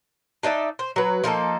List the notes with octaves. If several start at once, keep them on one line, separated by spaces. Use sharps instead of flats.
D4 D#4 D5 E5
C5
F#3 B4
F3 A#3 D#4 A4